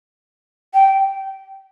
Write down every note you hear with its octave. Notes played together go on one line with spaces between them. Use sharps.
G5